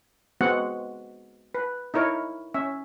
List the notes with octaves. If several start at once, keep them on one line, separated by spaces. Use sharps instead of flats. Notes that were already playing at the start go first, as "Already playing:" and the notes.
G#3 B3 C4 F#4 F#5
B4
D#4 E4 A#4 C#5
C#4 E5